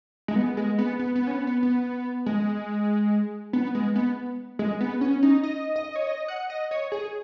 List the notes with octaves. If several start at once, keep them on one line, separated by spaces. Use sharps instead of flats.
G#3
B3
G#3
B3
B3
B3
C#4
B3
B3
B3
G#3
B3
G#3
B3
G#3
B3
C#4
D#4
D#5
D#5
C#5
D#5
F#5
D#5
C#5
G#4